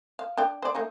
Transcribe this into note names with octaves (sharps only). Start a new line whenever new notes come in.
F5
D4 D5 G5
C5 D5
A3 A#3 D#4